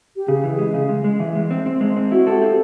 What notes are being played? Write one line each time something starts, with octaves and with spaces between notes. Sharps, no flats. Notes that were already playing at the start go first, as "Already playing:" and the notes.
G4
C#3 G#4
E3
G#3
C#3
G#3
G#3
E3
G#3
C4
C4
G#3
C4
E4 F#4
G4 A4
C4